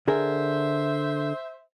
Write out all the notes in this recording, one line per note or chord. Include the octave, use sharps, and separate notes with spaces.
D3 G#4 A#4 C5 E5